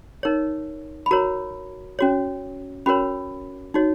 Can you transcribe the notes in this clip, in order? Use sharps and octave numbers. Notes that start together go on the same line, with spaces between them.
D#4 A#4 C#5
B5
F#4 A#4 C#5 A#5
C#4 F#4 C#5
C#4 F#4 A#4 C#5 B5
D#4 F#4 C#5